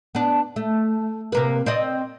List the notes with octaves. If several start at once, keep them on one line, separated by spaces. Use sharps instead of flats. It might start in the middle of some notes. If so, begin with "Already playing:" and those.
B3 D4
A3
C3 A#3 B4
C4 D5 D#5